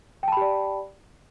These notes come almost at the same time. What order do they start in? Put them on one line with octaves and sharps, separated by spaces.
G5 A5 B5 G4 D5